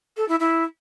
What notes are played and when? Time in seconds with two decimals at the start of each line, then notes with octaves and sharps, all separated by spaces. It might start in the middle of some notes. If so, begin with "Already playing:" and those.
0.17 A4
0.28 E4
0.40 E4